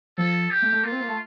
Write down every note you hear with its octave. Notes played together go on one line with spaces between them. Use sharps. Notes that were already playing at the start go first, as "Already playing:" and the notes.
F3 A4
G4
A3
A3
A#3 F4
C4
A#3
A3